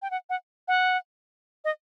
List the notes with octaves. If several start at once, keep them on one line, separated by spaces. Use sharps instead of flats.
G5
F#5
F#5
F#5
D#5